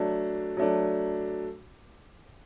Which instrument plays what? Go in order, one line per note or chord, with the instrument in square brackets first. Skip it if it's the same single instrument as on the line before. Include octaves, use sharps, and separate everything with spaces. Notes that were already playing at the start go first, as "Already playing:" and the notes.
Already playing: [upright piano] F#3 A3 D4
F#3 A3 D4